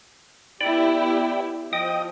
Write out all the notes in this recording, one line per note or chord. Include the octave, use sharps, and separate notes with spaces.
B3 E4 G4 D5 G5 B5
F3 D#5 G5 D#6